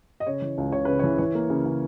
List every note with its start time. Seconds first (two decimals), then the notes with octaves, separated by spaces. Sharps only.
0.20 D#5
0.27 C#3 C#5
0.42 E3
0.58 C#2
0.72 C#2 C#5
0.85 C#3 B4
0.99 E3 C#5
1.18 E3 C#5
1.35 A#3
1.50 C#3
1.65 C#3